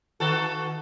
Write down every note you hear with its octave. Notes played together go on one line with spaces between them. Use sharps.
D#3 F#4 A4